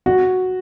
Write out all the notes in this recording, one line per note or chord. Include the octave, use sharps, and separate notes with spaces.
F#4